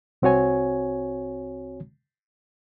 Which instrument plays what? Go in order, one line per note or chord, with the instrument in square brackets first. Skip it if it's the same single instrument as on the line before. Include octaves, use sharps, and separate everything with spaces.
[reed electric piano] C2 C4 F#4 C#5 G#5